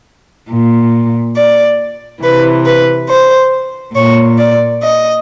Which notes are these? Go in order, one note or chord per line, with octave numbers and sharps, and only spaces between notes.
A#2
D5
C3 E3 B4
B4
C5
A#2 C#5
D5
D#5